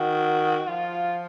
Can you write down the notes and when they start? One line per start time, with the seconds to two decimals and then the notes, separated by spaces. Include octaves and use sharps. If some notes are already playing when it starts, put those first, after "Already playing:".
Already playing: D#3 F#4
0.68 F3 F4